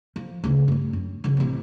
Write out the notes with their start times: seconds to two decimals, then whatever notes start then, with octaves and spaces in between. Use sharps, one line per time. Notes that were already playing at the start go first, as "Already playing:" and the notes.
0.16 F3
0.44 D2 C#3
0.68 G2 A3
0.93 F#2
1.24 C#3 F#3
1.37 A1 C3